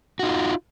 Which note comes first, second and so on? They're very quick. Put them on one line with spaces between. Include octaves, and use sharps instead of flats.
F#4 D#4 F4